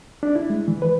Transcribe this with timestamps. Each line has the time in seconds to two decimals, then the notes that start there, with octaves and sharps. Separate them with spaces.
0.23 D4
0.35 E4
0.50 G#3
0.68 E3
0.82 B4